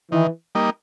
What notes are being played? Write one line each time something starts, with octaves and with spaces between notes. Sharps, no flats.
D#3 E3
G3 A#3 D#4